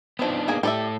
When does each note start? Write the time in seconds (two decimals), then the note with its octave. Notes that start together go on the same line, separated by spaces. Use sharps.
0.19 F3 B3 C4 D4 D#4
0.48 A#3 G#4
0.63 A2 G4 A4 D5 E5